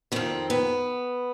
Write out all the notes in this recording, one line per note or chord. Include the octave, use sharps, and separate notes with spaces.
F2 D#3 C4
B3